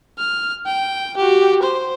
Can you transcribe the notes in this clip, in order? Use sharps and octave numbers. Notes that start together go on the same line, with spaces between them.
F6
G5
F#4 G4
C5